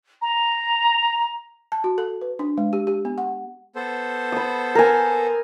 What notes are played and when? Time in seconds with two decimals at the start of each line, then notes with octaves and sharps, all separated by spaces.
0.21 A#5
1.72 A5
1.84 F#4
1.98 A4
2.21 B4
2.39 D4
2.58 G#3
2.73 G4
2.87 G4
3.05 B3
3.18 F#5
3.76 B3 A4 C5
4.32 B5 D#6
4.75 A#4 G#5